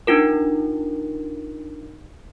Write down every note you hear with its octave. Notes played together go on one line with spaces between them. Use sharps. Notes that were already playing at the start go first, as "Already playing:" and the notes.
D4 D#4 F4 A#4